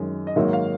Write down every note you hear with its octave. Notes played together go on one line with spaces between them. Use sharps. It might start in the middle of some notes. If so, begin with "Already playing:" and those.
Already playing: F#2 D#3 G#3
D#5
G#2 D#3 F#3 A#3 E5
F5